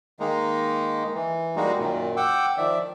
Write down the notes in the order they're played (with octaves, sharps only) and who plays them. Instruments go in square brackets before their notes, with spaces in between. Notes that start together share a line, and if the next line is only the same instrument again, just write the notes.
[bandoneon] D#3 G#3 A#3 D#4
E3
G3 G#3 A#3 D#4 F#4
F#2 A#2 D#3
F#5 G5 D6 E6
D#3 F3 D5 E5